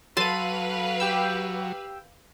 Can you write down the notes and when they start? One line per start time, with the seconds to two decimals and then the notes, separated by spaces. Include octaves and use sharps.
0.17 F#3 A4 B4 F5 A5 C6 D#7
1.00 G4 G5 E6